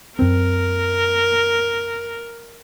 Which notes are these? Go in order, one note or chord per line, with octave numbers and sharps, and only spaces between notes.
F#2 C4 A#4